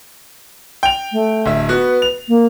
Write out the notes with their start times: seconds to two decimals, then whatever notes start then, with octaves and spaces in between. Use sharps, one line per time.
0.83 G5 F7
1.12 A3
1.46 D1 E5
1.69 B3 F#4 B4
2.02 F7
2.28 A#3